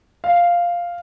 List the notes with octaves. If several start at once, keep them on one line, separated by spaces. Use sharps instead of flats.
F5